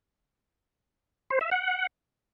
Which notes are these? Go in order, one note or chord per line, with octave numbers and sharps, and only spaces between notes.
C5
E5
F#5